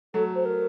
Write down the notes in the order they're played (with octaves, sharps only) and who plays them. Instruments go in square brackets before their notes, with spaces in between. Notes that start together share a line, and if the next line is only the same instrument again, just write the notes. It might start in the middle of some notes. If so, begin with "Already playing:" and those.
[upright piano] F#3 A3 [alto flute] A4
[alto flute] C5
A#4